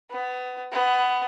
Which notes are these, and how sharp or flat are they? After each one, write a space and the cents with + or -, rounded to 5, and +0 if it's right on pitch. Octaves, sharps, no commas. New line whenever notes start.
B3 +25
B3 +15